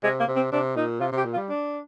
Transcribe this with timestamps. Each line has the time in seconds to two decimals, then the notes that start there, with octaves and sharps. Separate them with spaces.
0.04 C3 G#3
0.20 A#3
0.28 C3
0.36 C4
0.52 C3 D4
0.76 A#2 D#4
1.01 C3 F4
1.12 C3 G4
1.25 A#2
1.33 F4
1.37 G3
1.50 D4